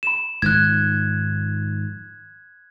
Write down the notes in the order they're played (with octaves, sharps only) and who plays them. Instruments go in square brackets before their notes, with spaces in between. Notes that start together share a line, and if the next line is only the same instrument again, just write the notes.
[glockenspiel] B5 E7
[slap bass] G#2 D#3 F3 [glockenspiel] F#6 G#6